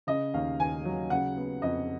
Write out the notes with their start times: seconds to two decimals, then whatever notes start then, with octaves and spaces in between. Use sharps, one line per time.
0.07 C#3 D#5
0.34 D#2 F5
0.60 D#2 G#5
0.85 F#3
1.10 C#3 F#5
1.37 B3
1.62 F2 D#5